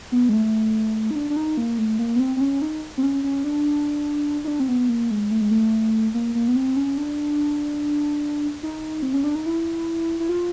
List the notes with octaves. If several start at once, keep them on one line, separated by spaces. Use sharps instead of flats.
B3
G#3
A3
D#4
D4
D4
D#4
A#3
A3
A#3
B3
C4
C4
C#4
D#4
C4
C#4
C#4
D4
D#4
D4
C4
B3
A#3
G#3
A3
G#3
A3
A#3
A#3
B3
C4
C#4
D4
D#4
C4
C#4
D4
D#4
E4
E4
F4